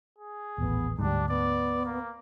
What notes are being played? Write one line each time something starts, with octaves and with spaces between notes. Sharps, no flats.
G#4
D#1 A1 B3
D2 G#2 G3 D4
B3 D5
A#3